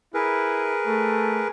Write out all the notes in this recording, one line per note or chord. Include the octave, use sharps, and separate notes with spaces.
E4 G#4 A#4 B4
A3